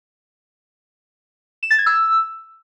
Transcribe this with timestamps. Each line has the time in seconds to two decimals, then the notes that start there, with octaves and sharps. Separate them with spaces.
1.63 E7
1.71 A6
1.78 G#6
1.86 E6